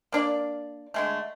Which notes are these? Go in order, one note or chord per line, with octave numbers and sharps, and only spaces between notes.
A#3 D4 D5
D3 G#3 A3